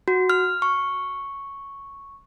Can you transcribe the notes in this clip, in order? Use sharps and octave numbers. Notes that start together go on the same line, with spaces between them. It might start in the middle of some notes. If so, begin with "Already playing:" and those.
F#4
F6
C#6